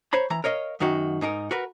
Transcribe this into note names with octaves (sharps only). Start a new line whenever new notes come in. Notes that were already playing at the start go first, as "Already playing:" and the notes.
C5 C#5 A#5 B5
E3 A#5
A#4 C#5 D#5 F5
F#2 D#3 D#4 F#4
G#2 D#4 G#4 A#4
F#4 A#4 B4